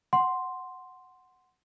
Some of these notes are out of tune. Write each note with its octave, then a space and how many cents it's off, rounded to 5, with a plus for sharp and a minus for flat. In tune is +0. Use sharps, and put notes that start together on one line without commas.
F#5 +0 C6 +0